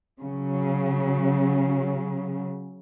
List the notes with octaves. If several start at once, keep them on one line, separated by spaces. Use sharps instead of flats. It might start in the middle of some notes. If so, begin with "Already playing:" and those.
C#3 F#3